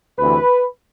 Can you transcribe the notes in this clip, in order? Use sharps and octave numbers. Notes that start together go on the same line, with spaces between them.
D2 C3 E3 B4